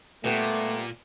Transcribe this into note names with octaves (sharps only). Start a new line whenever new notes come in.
A#2 G3 A3 B3 G4